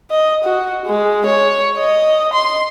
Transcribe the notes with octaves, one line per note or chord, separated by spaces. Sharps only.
D#5
F#4
G#3
C#5
D#5
C6